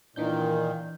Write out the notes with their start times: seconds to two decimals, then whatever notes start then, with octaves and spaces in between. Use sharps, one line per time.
0.16 A#2 D#3 E3 D4 G6